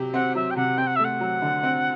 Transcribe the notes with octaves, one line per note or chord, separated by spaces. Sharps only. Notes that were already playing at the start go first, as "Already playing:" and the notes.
Already playing: C3 F#3 G4
C4 F#5
F#3 E5
G5
C3 F#5
C4 G5
F#5
A3 E5
F#5
F#3
D3
C4